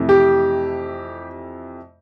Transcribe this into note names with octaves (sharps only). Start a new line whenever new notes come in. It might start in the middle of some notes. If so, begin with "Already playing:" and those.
Already playing: F2 C3 E3 A3
G4